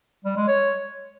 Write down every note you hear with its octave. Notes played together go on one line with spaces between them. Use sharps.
G3
G#3
C#5